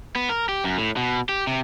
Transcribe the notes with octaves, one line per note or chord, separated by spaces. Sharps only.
B3
A#4
G4
F#2
A2
B2
G4
C3